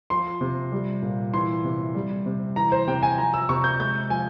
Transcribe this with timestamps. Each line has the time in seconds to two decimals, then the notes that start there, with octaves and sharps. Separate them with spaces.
0.10 F3 C6
0.41 C3
0.72 G3
1.02 A#2
1.34 E3 C6
1.64 C3
1.95 G3
2.26 C3
2.56 E3 A#5
2.72 C5
2.87 C3 G5
3.03 G#5
3.18 F3 A#5
3.34 E6
3.49 C3 C#6
3.64 G6
3.80 G#3 G6
4.10 F3 G#5